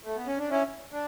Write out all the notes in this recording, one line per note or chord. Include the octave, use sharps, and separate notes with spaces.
A3
B3
C#4
D4
C#4 E4
D4